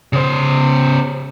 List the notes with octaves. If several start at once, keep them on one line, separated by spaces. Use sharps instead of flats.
C#3 C5